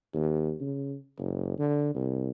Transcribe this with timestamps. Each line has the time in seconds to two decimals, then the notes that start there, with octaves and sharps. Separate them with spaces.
0.13 D#2
0.61 C#3
1.18 F#1
1.58 D3
1.95 C2